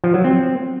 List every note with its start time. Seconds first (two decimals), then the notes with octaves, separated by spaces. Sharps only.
0.04 F3
0.14 F#3
0.24 C4